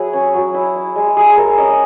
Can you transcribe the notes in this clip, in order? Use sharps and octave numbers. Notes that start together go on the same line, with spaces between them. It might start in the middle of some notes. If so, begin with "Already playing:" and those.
Already playing: F#3 E4 G#4 E5
C#4
F#3
E4
E4
G#3
E4 G#4
G#3 A#4
C#4 D#5